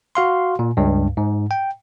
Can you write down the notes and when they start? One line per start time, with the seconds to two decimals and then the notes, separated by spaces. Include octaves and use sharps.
0.15 F#4 F5 C6
0.59 A#2
0.77 C#2 G2
1.17 G#2
1.51 G5